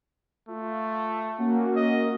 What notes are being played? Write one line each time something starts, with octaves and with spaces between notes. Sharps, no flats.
A3 F4
A#3 C#4 F#4
D#5